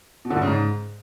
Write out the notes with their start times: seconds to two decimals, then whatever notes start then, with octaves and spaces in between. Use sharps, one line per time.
0.25 B2
0.30 D3
0.36 G2
0.42 C#3
0.47 G#2